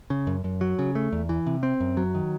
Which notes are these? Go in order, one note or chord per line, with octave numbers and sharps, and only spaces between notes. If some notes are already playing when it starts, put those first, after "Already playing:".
C#3
F#2
F#2
F#3
C#3
A3
E2
E3
C3
C4
F#2
F#3
D#3